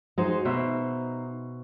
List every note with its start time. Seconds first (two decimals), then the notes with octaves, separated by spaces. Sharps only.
0.18 G#3 D#4 F#4 C5
0.45 B2 D#4 C5 E5